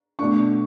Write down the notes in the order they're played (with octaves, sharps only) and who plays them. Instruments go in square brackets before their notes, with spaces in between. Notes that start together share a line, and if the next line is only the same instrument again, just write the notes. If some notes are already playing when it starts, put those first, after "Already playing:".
[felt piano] B2 A3 D4 C#6